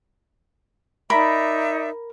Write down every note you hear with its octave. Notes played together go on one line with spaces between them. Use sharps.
D#4 A#4 D5 E5 B5